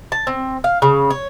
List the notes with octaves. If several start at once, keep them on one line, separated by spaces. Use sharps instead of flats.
A5
C4
F5
C#3
C#5